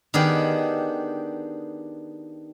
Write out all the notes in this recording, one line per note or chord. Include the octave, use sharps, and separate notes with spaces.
D#3 B3 D4 G4 G#4